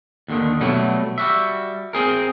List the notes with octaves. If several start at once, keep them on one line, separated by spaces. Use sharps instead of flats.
D#2 D3 D#3
B2 F#3 G3 A3
G3 F#4 E5
C4 G#4 A#4